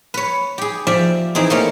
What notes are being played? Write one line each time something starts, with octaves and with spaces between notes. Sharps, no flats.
B4 C#5
G4 G#4
F3 G4 D5 E5
E3 C4 D#4 G#4
A3 A#3 C#4